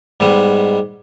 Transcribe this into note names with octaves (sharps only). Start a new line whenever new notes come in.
G#2 G3 G#3 B3